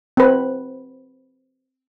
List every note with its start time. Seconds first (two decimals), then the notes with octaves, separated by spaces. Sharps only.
0.17 C4 B4